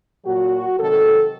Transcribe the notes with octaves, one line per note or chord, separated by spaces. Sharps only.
A#2 F#3 F#4
C3 D#3 F#3 A4